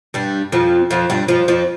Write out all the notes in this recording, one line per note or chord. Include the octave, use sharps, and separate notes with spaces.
G2 G3
F2 F3
F2 F3
G2 G3
F2 F3
F2 F3